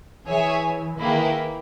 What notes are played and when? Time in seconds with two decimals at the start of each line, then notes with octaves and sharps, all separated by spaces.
0.27 E3 G#4 C#5 E5 G#5
0.99 D#3 A#3 E4 G#4 B4 G5